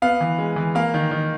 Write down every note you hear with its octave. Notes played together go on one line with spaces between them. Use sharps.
B3 F5
E3
G#3
E3
A#3 F5
D#3
D#3